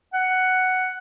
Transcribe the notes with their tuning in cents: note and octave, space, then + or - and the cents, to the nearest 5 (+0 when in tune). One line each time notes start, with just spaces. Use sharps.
F#5 +5